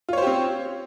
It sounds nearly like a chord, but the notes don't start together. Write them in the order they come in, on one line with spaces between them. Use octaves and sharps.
F4 C#5 C5 G4 C4